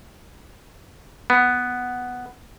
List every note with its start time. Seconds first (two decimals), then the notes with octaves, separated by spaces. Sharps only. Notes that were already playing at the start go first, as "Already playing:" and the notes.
1.30 B3